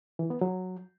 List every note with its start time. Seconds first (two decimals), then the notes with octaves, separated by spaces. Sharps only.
0.19 E3
0.30 B3
0.41 F#3